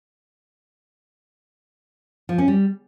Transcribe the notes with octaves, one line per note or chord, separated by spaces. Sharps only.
F3
C#4
G3